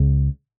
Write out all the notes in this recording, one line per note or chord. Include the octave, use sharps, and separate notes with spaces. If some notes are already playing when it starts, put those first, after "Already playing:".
Already playing: C#2 C#3